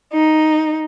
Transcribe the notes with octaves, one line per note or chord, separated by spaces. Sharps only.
D#4